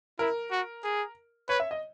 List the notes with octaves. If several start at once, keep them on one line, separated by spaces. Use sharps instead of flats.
E4 A#4
F#4
G#4
B4 C#5
E5
D#5